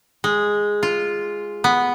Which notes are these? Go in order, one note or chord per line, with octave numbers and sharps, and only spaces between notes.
G#3
F4
B3